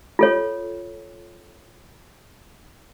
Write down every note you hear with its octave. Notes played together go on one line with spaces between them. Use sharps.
F4 A4 C#5